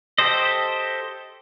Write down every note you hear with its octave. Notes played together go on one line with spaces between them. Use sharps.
G4 A4 C5 D#5